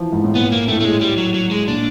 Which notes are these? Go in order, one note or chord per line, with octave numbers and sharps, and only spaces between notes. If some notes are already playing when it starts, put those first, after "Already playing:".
Already playing: E3 F3
G#2
A2
A#2 B3
A#3
A2 A3
A3
G#3
G3
F#3
F#3
G#3
A#2 D4